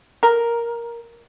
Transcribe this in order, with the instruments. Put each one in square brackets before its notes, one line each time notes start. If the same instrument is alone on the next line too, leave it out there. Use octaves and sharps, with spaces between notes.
[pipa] A#4